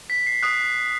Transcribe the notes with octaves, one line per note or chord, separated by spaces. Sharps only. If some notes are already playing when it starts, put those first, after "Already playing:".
B6
C7
D#6 F#6 C7